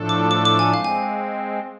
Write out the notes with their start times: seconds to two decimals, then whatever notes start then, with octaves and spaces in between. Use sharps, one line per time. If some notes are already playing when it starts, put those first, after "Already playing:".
Already playing: A2 F3 A3 D4 A4
0.09 D6
0.31 D6
0.45 D6
0.59 G#5
0.74 G#3 C4 F5
0.84 G#5